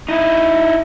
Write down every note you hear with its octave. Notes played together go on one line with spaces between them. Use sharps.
D#4 E4